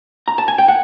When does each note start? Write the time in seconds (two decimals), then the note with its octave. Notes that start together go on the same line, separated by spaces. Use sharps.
0.28 A#5
0.38 A5
0.48 G#5
0.58 G5
0.68 F#5